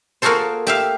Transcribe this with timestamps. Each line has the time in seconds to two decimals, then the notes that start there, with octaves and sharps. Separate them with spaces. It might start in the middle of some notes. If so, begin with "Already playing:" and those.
0.22 A#3 F4 F#4 G#4 A4 C5
0.67 G4 E5 F5